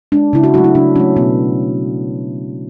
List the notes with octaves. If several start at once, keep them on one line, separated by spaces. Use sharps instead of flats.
G#3 D4
C#3 E4
F#4
F#3 A3 F#4
E4
C#3 D4
F#3 A3 C#4
B2 B3